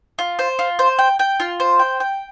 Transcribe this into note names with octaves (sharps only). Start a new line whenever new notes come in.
F4
C5
F4
C5
G5
G5
F4
C5
G5
G5